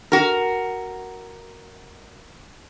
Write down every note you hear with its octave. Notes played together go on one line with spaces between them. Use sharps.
F#4 A#4